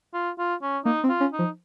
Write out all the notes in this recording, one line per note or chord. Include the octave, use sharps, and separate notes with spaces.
F4
F4
C#4
A#3 D#4
C4
F4
C#4
D#4
F3